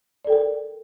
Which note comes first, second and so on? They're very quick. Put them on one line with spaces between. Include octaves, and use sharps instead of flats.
D5 A4 G5 A#4